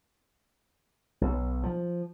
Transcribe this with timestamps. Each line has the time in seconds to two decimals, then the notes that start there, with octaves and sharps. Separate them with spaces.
1.21 B1
1.63 F3